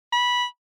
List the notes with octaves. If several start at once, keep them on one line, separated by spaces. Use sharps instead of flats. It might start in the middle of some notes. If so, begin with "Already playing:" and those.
B5